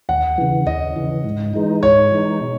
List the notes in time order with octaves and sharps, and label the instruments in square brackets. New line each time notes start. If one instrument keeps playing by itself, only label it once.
[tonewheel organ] D#2 [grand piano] F#5
[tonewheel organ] C#3 E3
[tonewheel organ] D#2 [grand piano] D#5
[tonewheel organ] C#3 E3
G#2
E3 G#3 D#4
[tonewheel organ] G#2 [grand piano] C#5
[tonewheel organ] E3 G#3 D#4
B2